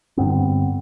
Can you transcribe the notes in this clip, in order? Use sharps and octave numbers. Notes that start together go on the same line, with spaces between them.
G2 D3 B3 C4